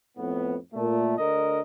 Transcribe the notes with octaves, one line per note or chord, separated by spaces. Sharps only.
F2 A2 B3
A#2 A3
D2 D3 A#4 D#5